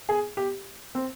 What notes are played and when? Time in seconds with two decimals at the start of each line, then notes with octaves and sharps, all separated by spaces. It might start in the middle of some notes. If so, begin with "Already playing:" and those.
0.09 G#4
0.37 G4
0.95 C4